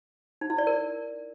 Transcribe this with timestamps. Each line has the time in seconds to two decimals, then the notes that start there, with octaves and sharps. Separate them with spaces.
0.41 D#4
0.50 E4
0.58 D5
0.67 A#4